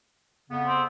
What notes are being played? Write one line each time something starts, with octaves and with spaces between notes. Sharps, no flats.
F2 C#3 B3
C4